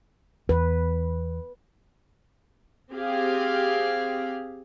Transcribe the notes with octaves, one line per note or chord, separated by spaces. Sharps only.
E2 B4
C4 G4 G#4 F5